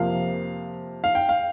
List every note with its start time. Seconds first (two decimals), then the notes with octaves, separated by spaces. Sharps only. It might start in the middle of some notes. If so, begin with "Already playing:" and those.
Already playing: F2 C3 F3 A#3 F5
1.04 F5
1.15 G5
1.29 F5